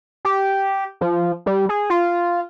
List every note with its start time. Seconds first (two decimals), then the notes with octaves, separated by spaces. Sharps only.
0.25 G4
1.01 F3
1.46 G3
1.69 G#4
1.90 F4